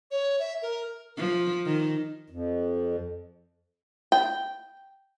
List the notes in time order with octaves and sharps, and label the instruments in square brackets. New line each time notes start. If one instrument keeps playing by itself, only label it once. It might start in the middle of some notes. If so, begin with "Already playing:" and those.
[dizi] C#5
E5
A#4
[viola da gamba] F3
D#3
[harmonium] F2
[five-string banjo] G5